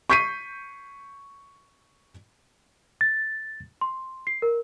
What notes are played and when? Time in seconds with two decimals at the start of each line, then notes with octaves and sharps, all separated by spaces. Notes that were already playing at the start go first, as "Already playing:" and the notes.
0.10 C#6 G6 B6 C7 D#7
3.01 A6
3.81 C6
4.27 C7
4.42 A#4